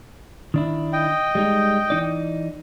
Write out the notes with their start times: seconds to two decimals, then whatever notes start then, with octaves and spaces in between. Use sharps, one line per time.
0.54 D#3 D4 E4
0.93 D#5 G5
1.35 G3 G#3 D#4
1.90 E3 D#4 D5